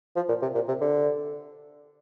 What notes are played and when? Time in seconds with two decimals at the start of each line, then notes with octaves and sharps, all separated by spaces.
0.16 F3
0.28 A#2
0.42 C3
0.55 A#2
0.68 C3
0.81 D3